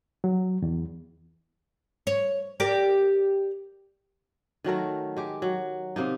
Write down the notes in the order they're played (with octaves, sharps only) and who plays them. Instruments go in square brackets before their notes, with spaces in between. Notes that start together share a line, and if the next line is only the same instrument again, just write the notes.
[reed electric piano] F#3
E2
[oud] C#5
G4 A#4 D5
[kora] D#3 F#3 A3 A#4
G#3 G4
F#3
C3 A#3 D#4